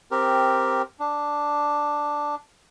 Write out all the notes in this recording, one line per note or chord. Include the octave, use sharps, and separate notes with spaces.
C4 G4 A#4
D4